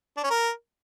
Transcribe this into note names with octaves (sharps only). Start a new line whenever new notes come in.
D4
C#4
A#4